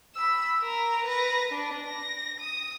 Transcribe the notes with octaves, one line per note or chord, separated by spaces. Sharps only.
B5 E6
A#4 A#5
B4 A#6
D4
A#6
D#6